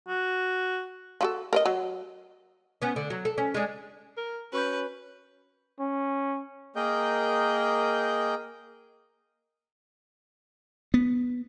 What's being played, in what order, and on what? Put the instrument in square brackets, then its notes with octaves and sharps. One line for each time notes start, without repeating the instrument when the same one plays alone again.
[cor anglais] F#4
[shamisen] F3 F#4 A4
A#4 C#5 D#5
F#3
[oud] B3 C#4
D3
F#3
A4
C#4
G#3 D4
[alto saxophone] A#4
[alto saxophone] C#4 [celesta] F#4 C#6 G6 [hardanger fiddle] B4
[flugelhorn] C#4
[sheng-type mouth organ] A#3 G#4 A#4 D#5 G5 G6
[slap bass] B3